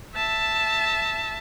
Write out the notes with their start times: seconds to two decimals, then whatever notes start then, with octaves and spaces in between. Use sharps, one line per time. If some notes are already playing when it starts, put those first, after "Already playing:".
0.15 E5 A5